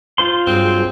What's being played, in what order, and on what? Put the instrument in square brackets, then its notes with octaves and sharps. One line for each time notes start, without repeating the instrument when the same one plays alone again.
[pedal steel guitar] F4 C5 C6
[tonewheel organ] G2 F#3 G#4 [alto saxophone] C4